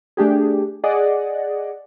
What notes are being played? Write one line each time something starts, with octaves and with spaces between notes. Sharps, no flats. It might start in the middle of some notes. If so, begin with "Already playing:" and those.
A3 D4 G4 G#4
G#4 D5 D#5 F#5